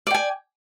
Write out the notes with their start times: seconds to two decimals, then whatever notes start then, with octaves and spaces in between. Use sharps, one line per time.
0.07 D5
0.11 G5
0.14 G#5